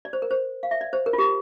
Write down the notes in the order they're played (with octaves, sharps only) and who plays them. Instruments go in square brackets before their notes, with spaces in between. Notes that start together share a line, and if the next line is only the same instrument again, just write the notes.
[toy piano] D5
C5
A#4
C5
F5
E5
D5
C5
A#4
F4
G4